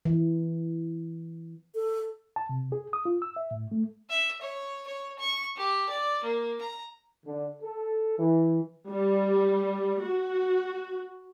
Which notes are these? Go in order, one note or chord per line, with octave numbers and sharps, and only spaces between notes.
E3
A4
A5
C3
G#4
D#6
F4
E6
E5
A2
A3
E5
C#5
C#5
C#6
G4
D5
A#3
A#5
D3
A4
E3
G3
F#4